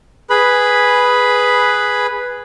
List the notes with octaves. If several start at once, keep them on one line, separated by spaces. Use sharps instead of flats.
G#4 B4 B5